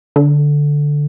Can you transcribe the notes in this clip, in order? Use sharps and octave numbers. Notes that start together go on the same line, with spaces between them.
D3